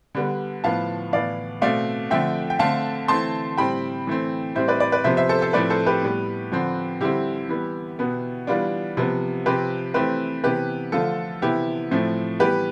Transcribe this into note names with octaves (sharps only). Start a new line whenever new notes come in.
D3 G3 B3
A2 F3 B3 F5 A5
A2 E3 B3 D5 F5
B2 A3 C4 D5 F5
D3 F3 A3 C4 E5 G5
G5
D3 A3 C4 F5 A5
E3 A3 C4 A5 C6
A2 G3 C4 G5 B5
E3 A3 C4
A2 G3 C4 C5 E5
B4 D5
B4 D5
B4 D5
C3 F3 B3 C5 E5
C5 E5
A4 C5
A4 C5
A2 F3 A3 C4 B4 D5
A4 C5
G4 B4
A2 G3 B3
D3 F3 C4
D3 G3 C4 E4 G4
E3 G3 B3
B2 B3
E3 G3 B3 D4 F4
C3 F3 B3
C3 F3 C4 G4 B4
E3 A3 C4 G4 B4
C3 E3 B3 G4 B4
D3 F3 A3 F4 A4
C3 E3 B3 E4 G4
A2 F3 A3 C4
E3 G3 B3 G4 B4